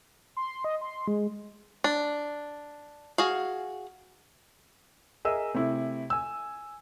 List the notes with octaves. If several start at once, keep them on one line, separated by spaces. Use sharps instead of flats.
C6
D#5
C6
G#3
D4
F#4 G#4 F5
G#4 A#4 D#5 E5 E6
C3 A3 E4
G#5 E6